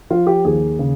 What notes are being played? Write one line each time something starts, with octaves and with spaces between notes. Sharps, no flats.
F3 F4
G4
D#2 G#4
C#3